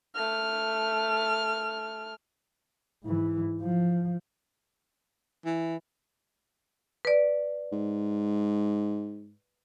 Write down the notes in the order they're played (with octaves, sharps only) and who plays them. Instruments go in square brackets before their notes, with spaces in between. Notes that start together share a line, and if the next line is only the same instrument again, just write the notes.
[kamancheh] A3 F6
[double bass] G#2 E3
F3
[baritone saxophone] E3
[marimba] B4 D5
[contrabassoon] G#2